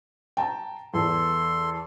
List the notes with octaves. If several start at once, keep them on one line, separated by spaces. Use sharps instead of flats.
G5 A5 A#5
E2 A4 C6